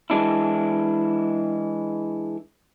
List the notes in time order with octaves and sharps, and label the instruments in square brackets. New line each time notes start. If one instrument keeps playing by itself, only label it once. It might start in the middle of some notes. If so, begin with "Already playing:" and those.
[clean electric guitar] E3 G#3 D4 E4